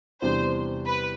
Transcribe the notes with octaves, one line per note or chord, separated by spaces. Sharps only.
E2 C3 G3 D4 C5
B4